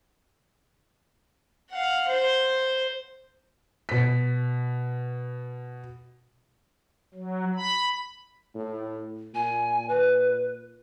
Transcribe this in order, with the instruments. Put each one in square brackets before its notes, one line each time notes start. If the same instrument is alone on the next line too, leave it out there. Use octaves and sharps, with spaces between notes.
[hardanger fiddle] F5 F#5
C5
[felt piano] B2 B6
[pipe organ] F#3
B5
[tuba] A2
[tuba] A#2 [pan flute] G#5
[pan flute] B4